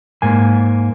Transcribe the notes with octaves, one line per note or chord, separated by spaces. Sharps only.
G#2 A#3 G#5